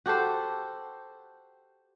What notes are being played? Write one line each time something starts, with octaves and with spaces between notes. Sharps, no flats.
F#4 G4 A4 C5